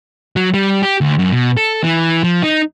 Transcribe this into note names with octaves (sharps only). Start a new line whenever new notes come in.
F#3
G3
G4
D2
F#2
B2
A4
E3
F3
D#4